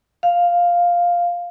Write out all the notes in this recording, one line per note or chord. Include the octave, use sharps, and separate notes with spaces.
F5